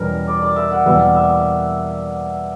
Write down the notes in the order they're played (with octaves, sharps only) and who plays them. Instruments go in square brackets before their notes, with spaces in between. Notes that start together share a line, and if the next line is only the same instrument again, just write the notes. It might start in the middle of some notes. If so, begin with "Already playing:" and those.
Already playing: [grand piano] E2 B2 G3 C#4 [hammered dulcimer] A#4
[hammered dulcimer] D5
D5
E5
F#5
[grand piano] E2 B2 G3 A#3 [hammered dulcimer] E5
[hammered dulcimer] E5
E5